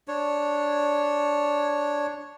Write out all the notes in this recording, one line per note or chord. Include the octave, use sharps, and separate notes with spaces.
D4 C#5